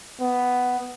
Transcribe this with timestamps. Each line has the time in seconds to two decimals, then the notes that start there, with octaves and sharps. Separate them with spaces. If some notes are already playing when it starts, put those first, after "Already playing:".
0.20 B3